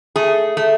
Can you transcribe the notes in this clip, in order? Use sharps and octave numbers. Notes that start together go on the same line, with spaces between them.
A3 G#4
A3